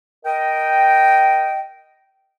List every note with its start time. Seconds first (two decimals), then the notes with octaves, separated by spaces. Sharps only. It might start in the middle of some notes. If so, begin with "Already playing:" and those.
0.24 A#4 D#5 G5